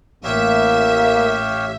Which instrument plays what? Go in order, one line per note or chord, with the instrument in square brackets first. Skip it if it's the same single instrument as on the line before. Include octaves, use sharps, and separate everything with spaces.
[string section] A1 E5 [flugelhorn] A#3 [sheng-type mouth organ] G4 C#5 F5